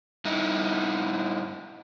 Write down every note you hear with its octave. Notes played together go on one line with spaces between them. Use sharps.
G2 D#4 E4